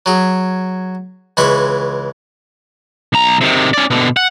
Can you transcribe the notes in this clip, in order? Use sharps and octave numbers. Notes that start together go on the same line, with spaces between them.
F#3 G#4
C#2 E3 G#3 B5 C#6
B1 A#5
C3 D#3
C#4 D5
B2 D3
F#5